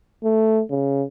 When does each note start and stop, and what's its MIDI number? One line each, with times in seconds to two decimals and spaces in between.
0.24 0.63 57
0.71 1.04 49